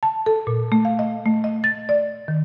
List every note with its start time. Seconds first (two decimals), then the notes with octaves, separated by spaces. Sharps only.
0.03 A5
0.26 A4
0.47 A#2
0.72 A3
0.85 F5
0.99 D#5
1.26 A3
1.44 D#5
1.64 A6
1.89 D5
2.28 D#3